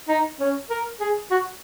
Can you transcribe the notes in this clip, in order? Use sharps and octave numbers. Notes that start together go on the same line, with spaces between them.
D#4
C#4
A#4
G#4
F#4